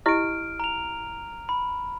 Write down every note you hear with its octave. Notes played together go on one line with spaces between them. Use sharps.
E4 G4 D#5 F6 D7
A#5 F7
B5